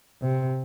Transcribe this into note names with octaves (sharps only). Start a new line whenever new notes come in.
C3